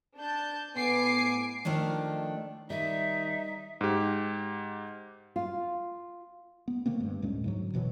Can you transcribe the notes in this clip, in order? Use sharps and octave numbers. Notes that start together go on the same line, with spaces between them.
D4 A5 G6
A2 B3 G#5 D6 C7
D#3 F3 A3 D4
D#3 G3 D#4 E5
G#2 G4
F4
B3
D3 A3 A#3 C4
G2
D2 A2 G#3 C#4
G#2 D3 F#3
F1 B2 E3 F#3